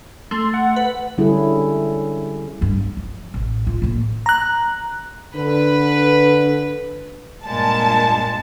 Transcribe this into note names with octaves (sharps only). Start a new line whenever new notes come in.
A3 C6
F#5
B4
D3 G3 C#4 E4 G#4 A4
G2 C4
B3
F3
A1
F4
A2 A#3
A#5 F#6
D3 B4
G2 A#2 G#3 A5